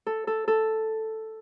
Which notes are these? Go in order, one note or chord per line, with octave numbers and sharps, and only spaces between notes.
A4
A4
A4